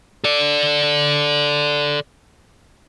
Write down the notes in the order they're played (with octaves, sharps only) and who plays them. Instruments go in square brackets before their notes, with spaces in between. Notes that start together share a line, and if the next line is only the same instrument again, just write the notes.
[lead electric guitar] A4 D5